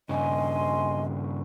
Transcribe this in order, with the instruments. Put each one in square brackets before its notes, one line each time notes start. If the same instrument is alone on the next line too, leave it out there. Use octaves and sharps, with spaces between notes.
[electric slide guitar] G2 C#3 [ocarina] D#5 [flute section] G#5 C6